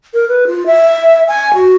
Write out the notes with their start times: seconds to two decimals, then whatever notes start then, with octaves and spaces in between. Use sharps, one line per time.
0.14 A#4
0.29 B4
0.47 F4
0.67 E5
1.28 G#5
1.54 F#4